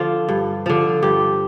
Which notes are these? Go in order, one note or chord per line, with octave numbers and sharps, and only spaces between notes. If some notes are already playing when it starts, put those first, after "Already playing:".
Already playing: D3 F3 F4 A4
G2
D3 F3
G2 G4